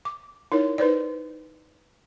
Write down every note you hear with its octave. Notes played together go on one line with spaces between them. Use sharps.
D6
D#4 E4 A#4 C#5
D#4 B4 C5 D5